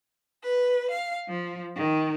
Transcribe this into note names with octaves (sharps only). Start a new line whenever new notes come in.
B4
F5
F3
D#3